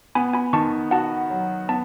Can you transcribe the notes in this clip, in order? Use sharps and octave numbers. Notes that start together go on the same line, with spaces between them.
B3 G#5 B5
G#5 B5
D#3 A5 C#6
F#4 F#5 A5
F#3
B3 A5